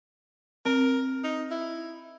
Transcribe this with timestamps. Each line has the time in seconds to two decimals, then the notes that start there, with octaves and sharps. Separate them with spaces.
0.65 C4 A#4
1.24 D#4
1.51 E4